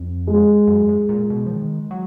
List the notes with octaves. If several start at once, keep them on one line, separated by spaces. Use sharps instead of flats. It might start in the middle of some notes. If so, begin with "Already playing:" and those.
Already playing: F2
G#3
F#2
G#2
A#2
B2
F3
D#3
F#3